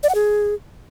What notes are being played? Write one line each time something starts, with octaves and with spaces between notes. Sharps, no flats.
D5
F#5
G#4